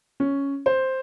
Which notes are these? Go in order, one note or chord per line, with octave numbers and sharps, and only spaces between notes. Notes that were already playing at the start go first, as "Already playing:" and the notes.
C#4
C5